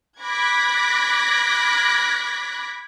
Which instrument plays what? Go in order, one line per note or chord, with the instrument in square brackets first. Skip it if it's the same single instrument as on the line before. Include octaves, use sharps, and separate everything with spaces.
[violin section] B5 D6 F#6 G#6 A#6 B6